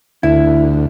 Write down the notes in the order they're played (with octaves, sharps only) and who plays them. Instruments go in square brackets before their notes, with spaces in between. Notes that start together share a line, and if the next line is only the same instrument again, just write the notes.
[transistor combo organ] D2 [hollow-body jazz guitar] E4